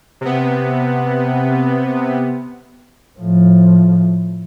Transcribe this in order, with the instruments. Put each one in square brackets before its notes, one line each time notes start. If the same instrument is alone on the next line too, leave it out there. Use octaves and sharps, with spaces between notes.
[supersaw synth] C3 B3
[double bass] A2 F3